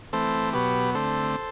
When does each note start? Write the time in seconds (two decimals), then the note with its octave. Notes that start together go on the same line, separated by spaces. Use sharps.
0.13 E3 A3 C4 A4 C5
0.53 B2 F#3 B3 G4 B4
0.94 D3 A3 C4 A4 C5